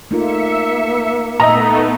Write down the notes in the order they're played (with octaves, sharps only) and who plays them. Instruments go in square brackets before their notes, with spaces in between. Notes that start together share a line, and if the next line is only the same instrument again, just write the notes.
[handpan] A3 D#4 F4 [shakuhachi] A#3 [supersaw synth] E5 C#7
[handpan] A#2 E5 [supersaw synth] A3 B3 D#4 [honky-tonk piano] D#5 A#5